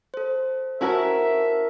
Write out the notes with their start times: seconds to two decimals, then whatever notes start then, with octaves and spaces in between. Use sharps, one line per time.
0.14 A4 C5
0.81 C#4 E4 F#4 A#4 E5 A5 C#6